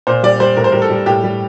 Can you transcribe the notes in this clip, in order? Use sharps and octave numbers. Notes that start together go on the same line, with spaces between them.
A#2 C5
G3 D5
G3 C5
A2 A#4
C5
G3 A#4
A4
G3
A2 G4
G3